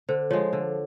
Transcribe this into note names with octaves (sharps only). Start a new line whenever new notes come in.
D3 C5
F3 G#3 C#5
D3